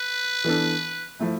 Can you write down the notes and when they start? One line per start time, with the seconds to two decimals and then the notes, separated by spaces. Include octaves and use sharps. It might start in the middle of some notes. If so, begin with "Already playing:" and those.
Already playing: B4
0.44 E3 B3 D4 A4
1.19 F3 A3 E4